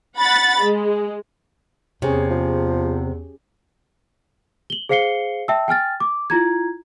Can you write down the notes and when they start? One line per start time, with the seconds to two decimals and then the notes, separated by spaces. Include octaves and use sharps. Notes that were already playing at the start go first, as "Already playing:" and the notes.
0.18 F#5 B5 A6
0.61 G#3
2.02 E2 C3 C#4 G#4 C#5
2.30 F3
4.70 F#7 G7
4.89 G#4 C5 F5 C7 C#7 G7
5.48 E5 G5 A5 E6
5.68 G5 G#5 F6 A6
6.00 D6
6.30 E4 F4 A#5 G#6